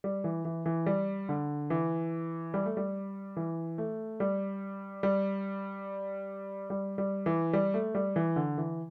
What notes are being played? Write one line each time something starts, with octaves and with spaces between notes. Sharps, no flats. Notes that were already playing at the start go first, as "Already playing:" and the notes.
G3
E3
E3
E3
G3
D3
E3
G3
A3
G3
E3
A3
G3
G3
G3
G3
E3
G3
A3
G3
E3
D3
E3